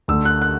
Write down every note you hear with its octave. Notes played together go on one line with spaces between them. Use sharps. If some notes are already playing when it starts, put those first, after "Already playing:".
D2 D3 A3 E6
F#6
F#6